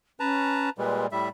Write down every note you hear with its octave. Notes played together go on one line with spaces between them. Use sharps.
C#4 B4 A5 A#5
A#2 G3 G#3 B4
A2 G3 E5 B5